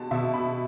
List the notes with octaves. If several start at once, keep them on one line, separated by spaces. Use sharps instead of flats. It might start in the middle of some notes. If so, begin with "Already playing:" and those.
Already playing: B2 A5
B2 E5
B5